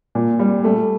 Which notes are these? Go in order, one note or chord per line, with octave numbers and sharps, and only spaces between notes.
A#2
G3
A3